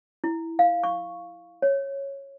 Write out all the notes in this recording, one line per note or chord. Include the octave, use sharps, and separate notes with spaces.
E4
F5
C#6
C#5